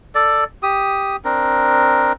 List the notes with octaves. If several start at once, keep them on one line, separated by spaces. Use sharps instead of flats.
A4 D5
G4 D#6
C4 D4 A#4